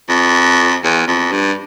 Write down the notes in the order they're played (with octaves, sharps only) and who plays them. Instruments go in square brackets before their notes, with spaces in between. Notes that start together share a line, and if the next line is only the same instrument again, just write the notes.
[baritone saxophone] F2
E2
F2
G2